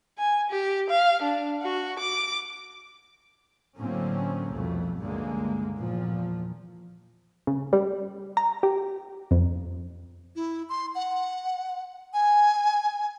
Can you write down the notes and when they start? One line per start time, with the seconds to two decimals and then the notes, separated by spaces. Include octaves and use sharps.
0.18 G#5
0.50 G4
0.90 F5
1.22 D4
1.63 F#4
2.00 D6
3.79 A2 D3 F#3 A#3 C4 C#4
4.50 C2 F2 B2 A3
4.99 C#2 G2 D3 G#3 A#3
5.78 E2 A#2 F3
7.47 C#3
7.73 G3
8.37 A#5
8.63 G4
9.31 F2
10.36 E4
10.69 C6
10.95 F#5
12.14 G#5